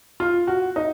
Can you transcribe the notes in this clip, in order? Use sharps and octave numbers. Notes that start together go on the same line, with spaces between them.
F4
F#4
D#4